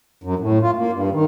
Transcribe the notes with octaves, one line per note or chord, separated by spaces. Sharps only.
F#2
A2
F4
A#3
G2
D#3